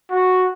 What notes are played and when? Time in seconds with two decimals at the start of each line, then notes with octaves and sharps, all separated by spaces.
0.11 F#4